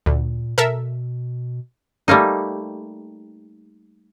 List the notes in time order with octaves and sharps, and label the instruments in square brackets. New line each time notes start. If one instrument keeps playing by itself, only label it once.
[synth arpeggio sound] D2 [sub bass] A#2
[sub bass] B2 [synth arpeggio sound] A4 A#4 E5
[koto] G3 A3 A#3 D#4